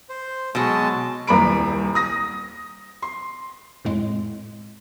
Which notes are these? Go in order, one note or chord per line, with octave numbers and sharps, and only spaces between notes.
C5
B2 F#3 G#3 A5
D#1 C2 A#5 B5 D7
D#6 A#6
C6
F2 A2 G#3